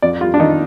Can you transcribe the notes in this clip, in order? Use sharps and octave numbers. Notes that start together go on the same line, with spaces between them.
F2 D5
G3 F4
D4
D#3 D#4